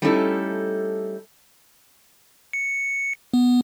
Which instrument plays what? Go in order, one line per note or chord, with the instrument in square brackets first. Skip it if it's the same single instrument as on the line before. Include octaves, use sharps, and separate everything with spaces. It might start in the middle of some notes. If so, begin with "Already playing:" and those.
[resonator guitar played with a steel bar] G3 A3 C#4 D#4 E4 A4
[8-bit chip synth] C#7
B3